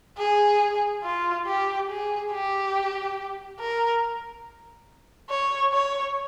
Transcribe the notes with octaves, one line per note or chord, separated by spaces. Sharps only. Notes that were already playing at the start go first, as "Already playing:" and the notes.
G#4
F4
G4
G#4
G4
A#4
C#5
C#5